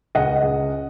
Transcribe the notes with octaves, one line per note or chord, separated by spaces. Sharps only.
C#2 D#5 F#5
C#3